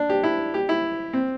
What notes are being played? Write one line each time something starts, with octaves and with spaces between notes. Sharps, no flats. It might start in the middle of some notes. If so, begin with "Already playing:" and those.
Already playing: D4
G4
E4
G4
E4
C4